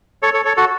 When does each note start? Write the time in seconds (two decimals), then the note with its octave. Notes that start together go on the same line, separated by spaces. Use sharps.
0.23 A4 C#5
0.34 A4 C#5
0.45 A4 C#5
0.57 F#4 A4